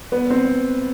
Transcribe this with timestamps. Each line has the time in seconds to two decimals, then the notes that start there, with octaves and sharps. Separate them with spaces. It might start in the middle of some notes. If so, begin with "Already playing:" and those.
0.12 B3
0.30 C4